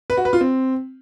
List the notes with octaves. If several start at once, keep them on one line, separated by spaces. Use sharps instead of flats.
B4
F#4
B4
F4
C4